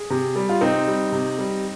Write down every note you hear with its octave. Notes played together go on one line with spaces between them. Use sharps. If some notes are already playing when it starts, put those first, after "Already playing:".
Already playing: G#4
C3
G3
F4
C3 C4 D#4
G3
C3
G3